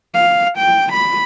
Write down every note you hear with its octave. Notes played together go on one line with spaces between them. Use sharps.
F5
G5
B5